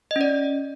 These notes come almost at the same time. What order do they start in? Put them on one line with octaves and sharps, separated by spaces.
D#5 C#4 D5